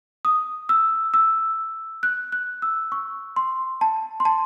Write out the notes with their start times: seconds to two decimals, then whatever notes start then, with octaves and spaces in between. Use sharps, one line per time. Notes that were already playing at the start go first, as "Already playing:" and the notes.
0.25 D#6
0.69 E6
1.14 E6
2.03 F#6
2.32 F#6
2.62 E6
2.92 C#6
3.36 C6
3.81 A5
4.20 C6
4.25 A5